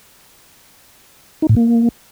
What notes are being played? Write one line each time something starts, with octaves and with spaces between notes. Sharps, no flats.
D#4
A2
A#3